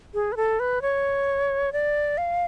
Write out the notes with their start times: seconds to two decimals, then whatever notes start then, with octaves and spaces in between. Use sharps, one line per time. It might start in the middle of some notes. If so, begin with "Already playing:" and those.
0.14 G#4
0.32 B4
0.37 A4
0.60 B4
0.82 C#5
1.73 D5
2.18 F5